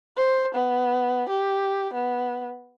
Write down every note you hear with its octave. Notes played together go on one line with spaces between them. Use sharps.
C5
B3
G4
B3